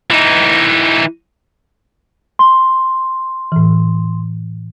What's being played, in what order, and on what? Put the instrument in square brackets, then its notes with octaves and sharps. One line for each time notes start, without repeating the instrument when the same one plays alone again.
[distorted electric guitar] E3 D#4
[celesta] C6
[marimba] A2 E3